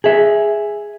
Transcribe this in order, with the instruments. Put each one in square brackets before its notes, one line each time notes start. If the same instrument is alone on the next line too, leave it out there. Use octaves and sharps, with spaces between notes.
[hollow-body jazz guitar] G#4 E5